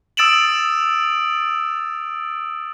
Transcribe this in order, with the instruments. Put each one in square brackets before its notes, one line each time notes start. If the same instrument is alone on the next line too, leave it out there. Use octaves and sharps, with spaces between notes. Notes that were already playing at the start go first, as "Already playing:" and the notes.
[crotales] D#6 E6 A6 D7 E7 F#7